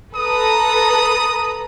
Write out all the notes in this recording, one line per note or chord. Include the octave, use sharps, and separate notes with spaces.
A4 B4 A#5 D#6